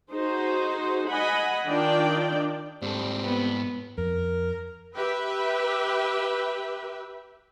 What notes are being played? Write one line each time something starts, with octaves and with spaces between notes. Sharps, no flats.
D#4 F#4 G#4 C5
D#5 F#5 G#5 B5
D#3 D4 F4 D5 G5
G#2 G3 C4 A4
B3
F2 A#4
G4 B4 E5